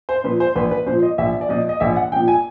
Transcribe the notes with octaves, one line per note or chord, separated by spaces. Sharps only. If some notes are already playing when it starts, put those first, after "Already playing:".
C5
A#2 F3 B4
C5
A#1 B4
B4
A#2 F3 C5
D#5
A#1 E5
D5
A#2 F3 D#5
D#5
A#1 E5
F#5
A#2 F3 G5
G#5